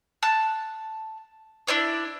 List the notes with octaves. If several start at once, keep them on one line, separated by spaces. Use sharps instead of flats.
A5 F#6
D4 E4 C#5 D5